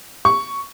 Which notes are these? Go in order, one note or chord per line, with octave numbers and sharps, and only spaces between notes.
C#6